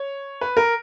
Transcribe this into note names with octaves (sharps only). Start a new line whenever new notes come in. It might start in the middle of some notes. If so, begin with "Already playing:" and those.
Already playing: C#5
B4
A#4